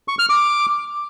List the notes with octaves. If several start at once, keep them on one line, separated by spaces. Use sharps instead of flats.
C#6
F6
D6